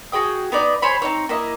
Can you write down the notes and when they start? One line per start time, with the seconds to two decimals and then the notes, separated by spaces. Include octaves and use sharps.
0.12 F#4 G#4 G5 D#6
0.52 B3 D#4 D5
0.82 G#4 C5 C#5 B5
1.02 C4 D#4 C#5
1.29 A#3 E4 D#5